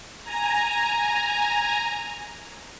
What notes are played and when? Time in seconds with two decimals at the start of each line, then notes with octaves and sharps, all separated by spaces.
0.23 G#5 A#5